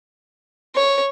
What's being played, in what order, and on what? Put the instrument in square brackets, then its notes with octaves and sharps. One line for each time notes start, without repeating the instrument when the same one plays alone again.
[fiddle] C#5